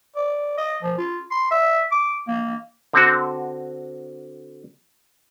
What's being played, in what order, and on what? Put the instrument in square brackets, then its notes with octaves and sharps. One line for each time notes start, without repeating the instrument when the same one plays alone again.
[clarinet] D5
D#5
F3
F4
C6
E5
D6
A#3
[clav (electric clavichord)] D3 C4 F#4